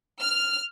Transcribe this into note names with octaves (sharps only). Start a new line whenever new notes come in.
F6